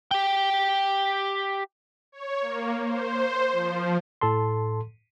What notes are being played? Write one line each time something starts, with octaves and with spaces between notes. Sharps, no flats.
G4 G5
C#5
A#3
C5
F3
A2 A4 A5 C6